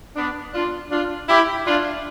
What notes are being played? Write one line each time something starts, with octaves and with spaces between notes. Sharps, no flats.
B3 D4
D4 F4
D4 F4
E4 G4
D4 F4